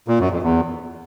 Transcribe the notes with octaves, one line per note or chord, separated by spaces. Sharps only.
A#2
F#2
F2
E2